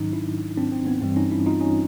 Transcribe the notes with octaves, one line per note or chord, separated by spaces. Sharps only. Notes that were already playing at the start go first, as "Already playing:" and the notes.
Already playing: G#2 D#3 F#3 C#4 D#4
D4 E4
C4 D4
C4
B3
G2 E3 G3 C4
C#4 D#4
D4 E4
D#4 F4
C#4 D#4